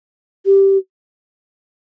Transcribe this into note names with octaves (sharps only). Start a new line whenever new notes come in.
G4